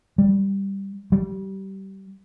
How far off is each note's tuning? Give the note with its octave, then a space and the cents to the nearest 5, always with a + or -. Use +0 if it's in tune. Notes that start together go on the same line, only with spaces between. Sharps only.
G3 +5
G3 -25